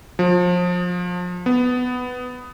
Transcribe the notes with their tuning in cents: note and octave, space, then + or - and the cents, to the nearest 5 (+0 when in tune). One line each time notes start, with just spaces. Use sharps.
F3 +30
B3 +10